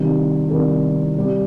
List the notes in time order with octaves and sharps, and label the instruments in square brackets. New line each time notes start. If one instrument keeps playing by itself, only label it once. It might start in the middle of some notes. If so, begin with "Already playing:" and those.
Already playing: [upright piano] C3 D#3 G3
C3 D#3 G3 A#4
C3 G3